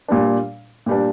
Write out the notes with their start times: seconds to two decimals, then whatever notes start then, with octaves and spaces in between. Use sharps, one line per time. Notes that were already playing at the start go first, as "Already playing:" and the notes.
0.08 A#2 G3 D4
0.86 A#2 G3 D4